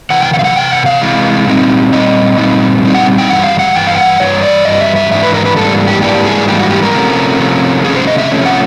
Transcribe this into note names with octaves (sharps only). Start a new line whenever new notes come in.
C3 E3 F#5
G5
F#5
F5
F#5
C3 E3 G5
F#5
F5
C3 E3 G#3
A#2 G3 C4 D#4
A#2 G3 C4 D#5
A#2 G3 C4 D#4
A#2 G3 C4 D#4
F#5
G5
G2 E3 G3 F#5
F5
F#5
G2 E3 G5
F5
F#5
G2 E3 C#5
D5
G2 E3 G3 D#5
E5
E5
G#2 E3 D4 E5
B4
A#4
B4
G#2 E3 G3 A#3 D4 A4
G4
G#2 E3 G3 A#3 D4 G4
G#4
G#2 E3 G3 A#3 D4 G4
F#4
G4
A#4
C3 F3 A3 C#4
C3 F3 A3 C#4
C3 F3 A3 C#4 G#4
C5
D#5
E5
C3 F3 A3 C#4
F#5